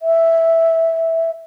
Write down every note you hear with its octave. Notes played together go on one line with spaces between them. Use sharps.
E5